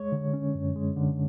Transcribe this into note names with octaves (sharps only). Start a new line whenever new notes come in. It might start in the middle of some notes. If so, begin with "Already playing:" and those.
Already playing: G#3 C#5
D3
C#4
F#2
G#3
D3